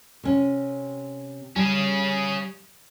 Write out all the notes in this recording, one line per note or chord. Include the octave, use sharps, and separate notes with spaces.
C3 C#4
G3 C#4 G#4